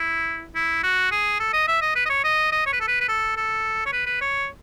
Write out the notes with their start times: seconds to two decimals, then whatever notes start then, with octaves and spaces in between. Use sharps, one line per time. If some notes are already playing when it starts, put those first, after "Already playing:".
Already playing: E4
0.55 E4
0.83 F#4
1.12 G#4
1.40 A4
1.53 D#5
1.68 E5
1.81 D#5
1.96 B4
2.05 D#5
2.09 C#5
2.24 D#5
2.52 D#5
2.66 C#5
2.73 B4
2.81 A4
2.88 B4
3.01 B4
3.08 A4
3.37 A4
3.86 C#5
3.93 B4
4.06 B4
4.21 C#5